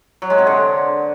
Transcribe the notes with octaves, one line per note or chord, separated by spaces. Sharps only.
F#3
G#3
C3
D3